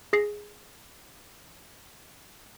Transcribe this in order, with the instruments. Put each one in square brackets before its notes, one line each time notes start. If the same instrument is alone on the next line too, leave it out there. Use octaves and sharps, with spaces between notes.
[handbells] G#4 A#6 C7